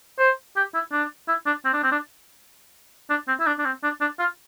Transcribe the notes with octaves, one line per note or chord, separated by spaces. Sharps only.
C5
G4
E4
D4
E4
D4
C4
D4
C4
D4
D4
C4
E4
D4
D4
C4
D4
D4
F4